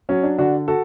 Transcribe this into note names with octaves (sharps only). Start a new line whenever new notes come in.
F#3 C#4
D4
D3 D4 F#4
F#4 A4